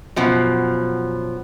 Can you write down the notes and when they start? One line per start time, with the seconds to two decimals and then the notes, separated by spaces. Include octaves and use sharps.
0.16 F#2 B2 F3